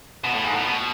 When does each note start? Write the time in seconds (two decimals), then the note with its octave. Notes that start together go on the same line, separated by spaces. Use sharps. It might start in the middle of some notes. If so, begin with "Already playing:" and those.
0.24 B2
0.34 A2
0.43 G#2
0.53 A2
0.65 B2